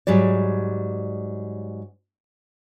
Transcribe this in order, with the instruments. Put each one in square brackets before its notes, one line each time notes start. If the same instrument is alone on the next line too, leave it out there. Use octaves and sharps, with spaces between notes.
[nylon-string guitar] G#2 F#3 G3 D5